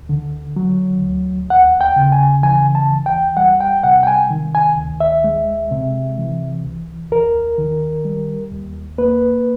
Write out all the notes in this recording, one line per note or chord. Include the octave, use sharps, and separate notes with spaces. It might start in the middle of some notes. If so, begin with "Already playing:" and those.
Already playing: D2
D3
F#3
D2
D#2 F#5
G5
C#3
G#5
E3 G#5
A5
D#2
G5
G3 F#5
G5
C3 F#5
G5
G#5
D#3
G#5
D2
E5
G#3
C3
E3
C2
D#2 A#4
D#3
G3
D#2
A#3 B4